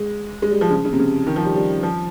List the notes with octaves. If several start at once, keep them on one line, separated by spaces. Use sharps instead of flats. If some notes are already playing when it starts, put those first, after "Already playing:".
Already playing: G#3
G#3
G3
F3
C#3
C#3
C3
C#3
D#3
F3
G3
G3
F3